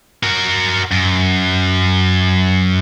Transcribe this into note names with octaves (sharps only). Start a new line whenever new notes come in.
F#4 A#4
F#2